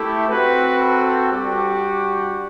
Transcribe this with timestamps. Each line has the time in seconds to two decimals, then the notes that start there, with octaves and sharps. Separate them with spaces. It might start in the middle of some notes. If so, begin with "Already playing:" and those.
Already playing: A3 E4 G4 A4
0.28 C4 F#4 B4
0.80 A4
1.31 G3 D4 F#4 G4